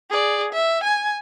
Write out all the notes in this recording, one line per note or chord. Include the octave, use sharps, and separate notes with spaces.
G#4 D5
E5
G#5